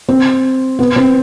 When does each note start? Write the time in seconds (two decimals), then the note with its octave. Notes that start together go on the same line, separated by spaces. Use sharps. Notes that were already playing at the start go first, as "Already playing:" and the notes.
0.09 C4
0.79 B3
0.96 C4